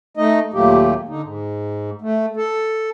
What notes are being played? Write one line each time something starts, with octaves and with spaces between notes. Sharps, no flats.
A3 D#4 D#5
D#2 A#2 F#3 A3 A#3 G4
D3 D#4
G#2
A3
A4